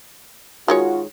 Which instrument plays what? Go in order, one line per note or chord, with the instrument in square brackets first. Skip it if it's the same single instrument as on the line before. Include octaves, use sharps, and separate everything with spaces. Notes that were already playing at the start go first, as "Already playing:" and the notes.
[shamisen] D#3 G#3 C#5 [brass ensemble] F4 F#4